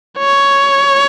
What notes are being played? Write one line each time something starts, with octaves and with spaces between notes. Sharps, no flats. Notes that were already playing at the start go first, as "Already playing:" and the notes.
C#5